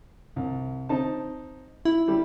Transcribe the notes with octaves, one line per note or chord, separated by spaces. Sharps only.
C2
C4 D#4 A5
E4
G3 G4 A4